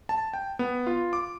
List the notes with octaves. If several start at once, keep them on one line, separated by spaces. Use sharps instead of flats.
A5
G5
B3
F4
D6